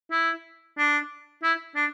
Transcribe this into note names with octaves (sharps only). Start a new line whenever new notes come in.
E4
D4
E4
D4